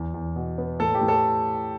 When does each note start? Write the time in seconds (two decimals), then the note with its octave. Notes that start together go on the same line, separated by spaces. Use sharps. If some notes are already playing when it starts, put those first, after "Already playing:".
Already playing: E2
0.14 E2
0.36 B2
0.58 B3
0.80 A2 A4
0.95 G4
1.01 A2
1.08 A4